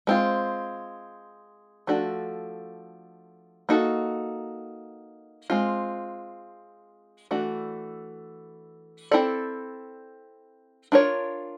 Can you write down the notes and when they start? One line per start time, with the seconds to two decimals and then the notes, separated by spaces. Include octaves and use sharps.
0.07 G#3 C4 F4
1.87 F3 A3 D4 F#4 A4
3.69 A#3 D#4 F#4 A4
5.50 G#3 C4 F4
7.31 E3 A3 D4 F#4
9.11 C4 E4 A4 D5
10.92 D4 F4 A#4 C#5